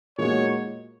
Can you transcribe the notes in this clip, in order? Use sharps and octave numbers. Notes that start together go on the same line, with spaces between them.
A#2 G#3 D#4 F#4 C#5